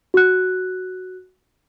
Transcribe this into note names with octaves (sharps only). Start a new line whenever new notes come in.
F#4 F#6